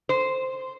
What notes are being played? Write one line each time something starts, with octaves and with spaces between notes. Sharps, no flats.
C5